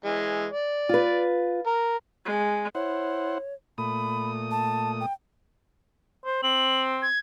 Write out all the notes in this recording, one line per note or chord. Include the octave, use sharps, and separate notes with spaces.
E3 G#3
D5
F4 B4
A#4
G#3
E4 C5 C#5 F#5
A#2 A3 B5 D#6
A5
G5
C5
C4 F#7
G#6